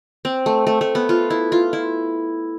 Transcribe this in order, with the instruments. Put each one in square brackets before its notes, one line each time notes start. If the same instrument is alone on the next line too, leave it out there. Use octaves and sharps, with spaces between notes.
[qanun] C4
A3
A3
A3
B3
F4
E4
F4
E4